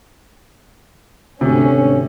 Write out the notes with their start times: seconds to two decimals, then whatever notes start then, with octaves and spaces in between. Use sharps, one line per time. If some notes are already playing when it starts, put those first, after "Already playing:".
1.41 G#1 D2 C3 C#4